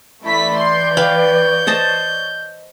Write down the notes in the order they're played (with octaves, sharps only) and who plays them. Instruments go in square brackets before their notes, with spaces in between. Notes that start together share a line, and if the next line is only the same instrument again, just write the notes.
[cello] E3 D5 [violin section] A3 E4 B6
[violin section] C6 [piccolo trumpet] G6
[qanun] B4 F5 G5 [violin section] C#5
[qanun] C5 D#5 A5